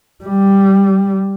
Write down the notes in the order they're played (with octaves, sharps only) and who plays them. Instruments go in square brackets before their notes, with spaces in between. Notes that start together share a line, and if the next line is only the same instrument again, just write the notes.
[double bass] G3